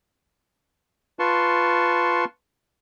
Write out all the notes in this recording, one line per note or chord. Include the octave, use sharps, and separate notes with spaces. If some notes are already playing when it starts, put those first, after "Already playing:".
F4 B4 A5 C6 C#6